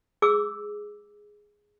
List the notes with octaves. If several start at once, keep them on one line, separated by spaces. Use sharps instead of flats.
G#4 D6 E6